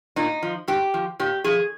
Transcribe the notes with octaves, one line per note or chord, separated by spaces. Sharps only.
A#2 D#4
F3
G#2 G4
F3
A#2 G4
F3 G#4